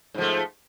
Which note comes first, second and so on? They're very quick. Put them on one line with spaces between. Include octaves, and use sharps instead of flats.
G#2 F3 A3